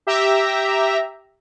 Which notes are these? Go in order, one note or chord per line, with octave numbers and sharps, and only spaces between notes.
G4 E5 A#5